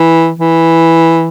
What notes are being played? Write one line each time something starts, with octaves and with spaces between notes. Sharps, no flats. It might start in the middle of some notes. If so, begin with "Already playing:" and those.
Already playing: E3
E3